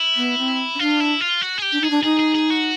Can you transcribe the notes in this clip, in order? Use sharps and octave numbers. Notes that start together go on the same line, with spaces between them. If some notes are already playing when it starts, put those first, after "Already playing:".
Already playing: E4
B3
C4
C#4
D4 F4
E4
F4
F#4
G#4
G4
D4
D#4 G#4
D4
D#4 G#4
G#4
G#4
F#4